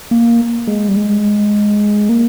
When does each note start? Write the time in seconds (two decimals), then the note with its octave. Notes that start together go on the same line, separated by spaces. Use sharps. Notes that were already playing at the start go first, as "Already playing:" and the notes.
0.11 A#3
0.67 G#3
0.88 G3
0.96 G#3
2.09 A#3